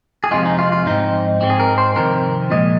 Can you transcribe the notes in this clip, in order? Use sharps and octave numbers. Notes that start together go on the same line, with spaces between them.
G#4
F2 C3 G#3 F4
D#4
F4
F4
G#2 F3 C4 D#4
G#2 G#3 C4
G#4
A#4
C5
F2 C3 D#3 C4 A#4
A#2 F3 G#3 D#5